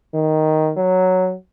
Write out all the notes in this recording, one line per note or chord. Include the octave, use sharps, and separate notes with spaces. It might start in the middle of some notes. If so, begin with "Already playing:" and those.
D#3
F#3